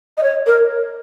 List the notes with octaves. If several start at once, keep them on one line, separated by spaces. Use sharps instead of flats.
D#5
C#5
A#4